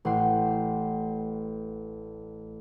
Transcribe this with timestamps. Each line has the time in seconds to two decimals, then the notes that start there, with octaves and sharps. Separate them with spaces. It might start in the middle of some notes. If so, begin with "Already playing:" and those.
0.05 A1 F#5 G5 C6